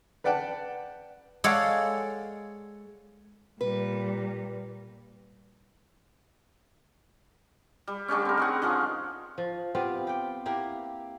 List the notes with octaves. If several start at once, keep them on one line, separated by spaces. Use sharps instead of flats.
B4 D5 F#5 G5 A5
G#3 A4 C#5 D5 F5 F#5
A#2 G3 B4
G3
D3 G3 A3 C#4
C4 A#4
D#3 G#4 F#5
D3 D#3 F3 C#4
F3
B3 C4 F4 G4
G4 G5
A#3 E4 G4